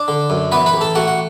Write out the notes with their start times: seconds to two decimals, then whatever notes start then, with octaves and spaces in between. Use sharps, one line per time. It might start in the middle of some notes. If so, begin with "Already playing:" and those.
Already playing: D4 D5
0.08 D3
0.30 F#2
0.52 E3 B3 B4
0.66 B4 B5
0.74 A1
0.81 A4 A5
0.95 A3 F#4 F#5
1.07 F#5